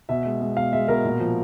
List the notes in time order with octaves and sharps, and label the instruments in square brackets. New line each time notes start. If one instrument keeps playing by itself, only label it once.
[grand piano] B2 E5
G#3
G#3
B2 F5
G#3 E5
B2 A#4
A#2
F3